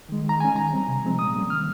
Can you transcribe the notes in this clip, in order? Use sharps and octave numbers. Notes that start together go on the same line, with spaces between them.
D#3 G#3
D#3
A#5
G#3 C#4 G#5
D#3 A#5
G3 C4
C3
F3 G#3 C4
A#2 D#6
G3 A#3 C#4
D#3 F6